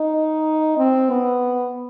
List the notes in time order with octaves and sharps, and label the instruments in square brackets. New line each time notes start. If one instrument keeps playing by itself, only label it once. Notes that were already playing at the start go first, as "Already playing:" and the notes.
Already playing: [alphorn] D#4
C4
B3